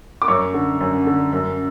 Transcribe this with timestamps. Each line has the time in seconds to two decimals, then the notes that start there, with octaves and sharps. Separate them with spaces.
0.22 D6
0.28 F#2 C#5 C#6
0.54 D3
0.80 F#2
1.07 D3
1.32 F#2